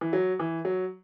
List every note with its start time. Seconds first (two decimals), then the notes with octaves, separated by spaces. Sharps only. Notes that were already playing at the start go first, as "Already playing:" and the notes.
0.01 E3
0.13 F#3
0.39 E3
0.65 F#3